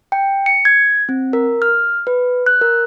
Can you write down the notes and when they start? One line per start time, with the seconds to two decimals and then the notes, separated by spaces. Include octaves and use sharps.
0.12 G5
0.46 C#7
0.65 G#6
1.09 C4
1.33 A#4
1.62 F6
2.07 B4
2.46 F#6
2.61 A#4